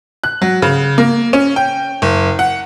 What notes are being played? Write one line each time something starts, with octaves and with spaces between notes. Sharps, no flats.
F#6
F#3
C#3
A#3
C#4
G5
F#1
F#5